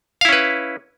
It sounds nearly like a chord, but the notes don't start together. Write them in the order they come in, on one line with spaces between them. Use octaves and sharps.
F5 E4 C#4 B4